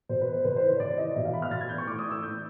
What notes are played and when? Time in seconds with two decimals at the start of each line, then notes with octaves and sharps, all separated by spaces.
0.09 B2 C5
0.21 B4
0.33 C5
0.45 C3 B4
0.56 C5
0.62 E3
0.69 C#5
0.80 C3 D5
0.97 E3 D#5
1.15 B2 E5
1.25 F5
1.33 B5
1.42 F6
1.51 B2 A6
1.61 G#6
1.69 G6
1.78 C#6
1.86 A2 D6
1.99 D#6
2.04 E3
2.11 E6
2.22 A2 G6